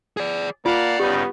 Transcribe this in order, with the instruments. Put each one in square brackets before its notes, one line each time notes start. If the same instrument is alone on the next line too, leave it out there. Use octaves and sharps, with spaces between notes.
[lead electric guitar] G#4 D5
[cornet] A#3 [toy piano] F4 [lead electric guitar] D5 [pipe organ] F5 F#5 A5
[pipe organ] G2 C#3 D#4 [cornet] B3 [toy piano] G4